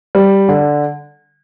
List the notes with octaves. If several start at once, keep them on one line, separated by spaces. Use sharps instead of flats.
G3
D3